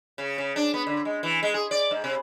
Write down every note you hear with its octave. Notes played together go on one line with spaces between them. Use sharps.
C#3
C#3
D4
B3
D3
G#3
E3
G#3
G#4
D5
G#2
C3